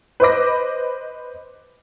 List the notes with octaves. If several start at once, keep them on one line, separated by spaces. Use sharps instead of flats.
B4 C5 D#5 B5 D6 A#6